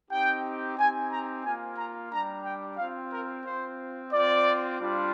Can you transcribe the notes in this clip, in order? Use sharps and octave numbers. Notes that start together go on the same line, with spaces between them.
C4 D#4 G4 G5
C4 D#4 G4 G#5
A#5
A#3 F4 G#5
A#5
G3 D4 G4 A#5
G5
C4 F4 F5
A#4
C4 F4 C5
C4 F4 D5
G3 D4 F4